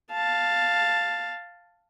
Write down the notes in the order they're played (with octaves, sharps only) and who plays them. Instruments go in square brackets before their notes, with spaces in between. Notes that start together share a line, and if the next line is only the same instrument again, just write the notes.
[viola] F5 A5